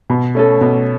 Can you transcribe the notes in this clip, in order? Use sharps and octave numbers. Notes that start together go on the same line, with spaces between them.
B2
A3 C#4 A4
B2